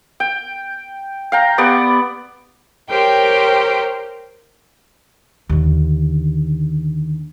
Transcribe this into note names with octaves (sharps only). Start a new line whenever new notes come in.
G5
F5 G5 A#5
B3 G4 D5 F#5
G4 A#4 C5 C#5 G5
D#2 D3